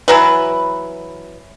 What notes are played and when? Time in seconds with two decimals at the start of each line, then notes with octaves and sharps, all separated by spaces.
0.08 E3 F#3 B4